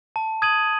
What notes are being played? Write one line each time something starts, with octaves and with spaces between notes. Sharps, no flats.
A5
D#6 G#6 D#7 F#7